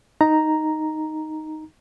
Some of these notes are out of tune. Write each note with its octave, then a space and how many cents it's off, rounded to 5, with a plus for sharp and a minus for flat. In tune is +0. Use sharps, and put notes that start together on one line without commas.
D#4 +0 A#5 +0